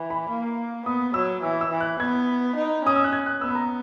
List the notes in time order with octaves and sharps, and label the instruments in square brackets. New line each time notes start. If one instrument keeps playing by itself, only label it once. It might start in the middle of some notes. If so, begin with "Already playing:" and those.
Already playing: [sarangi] E3
[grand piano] B5
[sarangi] A#3
[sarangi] B3 [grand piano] D#6
[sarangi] F#3 [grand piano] E6
[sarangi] E3 [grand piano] E6
[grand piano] E6
[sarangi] E3
[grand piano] F#6
[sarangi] B3 [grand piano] G#6
[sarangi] D#4
[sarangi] C#4 [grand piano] D#6
[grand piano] E6
F#6
G#6
F#6
[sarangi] B3 [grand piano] E6
[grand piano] B5
A#5